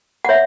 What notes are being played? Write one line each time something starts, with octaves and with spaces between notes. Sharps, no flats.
F#5
C#5 E5